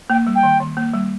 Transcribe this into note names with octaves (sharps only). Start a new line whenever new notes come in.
A#3 G5
G3
G5
D#3
D#3
A#3
G3